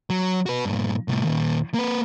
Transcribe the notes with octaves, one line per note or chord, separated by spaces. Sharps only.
F#3
F#4 B4
G2 A#2
C2 A2
D#2 A#2
A#3 B4